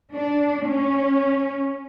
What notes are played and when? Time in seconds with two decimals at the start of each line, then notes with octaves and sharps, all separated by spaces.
0.13 D4
0.67 C#4